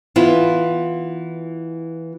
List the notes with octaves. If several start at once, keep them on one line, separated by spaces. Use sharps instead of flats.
E3 B3 E4 F4